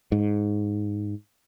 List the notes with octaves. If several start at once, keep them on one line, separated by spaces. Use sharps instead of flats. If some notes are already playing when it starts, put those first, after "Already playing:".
G#2